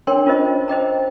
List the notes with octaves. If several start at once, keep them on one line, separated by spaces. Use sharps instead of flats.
D4 A#4 C#5 G5 C6
C#4 F4 A#4 C5 D#5
C5 D#5 G5 A#5